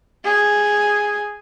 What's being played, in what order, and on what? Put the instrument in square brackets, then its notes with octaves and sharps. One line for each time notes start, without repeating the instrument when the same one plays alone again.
[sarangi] G#4